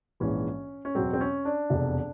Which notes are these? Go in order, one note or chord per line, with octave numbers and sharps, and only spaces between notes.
A#1 G#2 E3 C#4
C#4
E2 B2 F#3 C4
C4
C#4
D4
F1 E2 B2